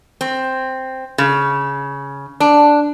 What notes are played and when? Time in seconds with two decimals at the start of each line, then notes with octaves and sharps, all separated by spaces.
0.21 C4
1.18 C#3
2.40 D4